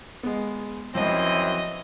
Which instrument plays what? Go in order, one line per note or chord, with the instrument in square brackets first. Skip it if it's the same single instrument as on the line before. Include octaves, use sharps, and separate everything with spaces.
[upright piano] G#3 B3
[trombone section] F#2 E3 C4 [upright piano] F3 [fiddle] D#5